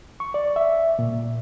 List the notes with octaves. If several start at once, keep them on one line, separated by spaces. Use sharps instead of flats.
C#6
D5
E5
A#2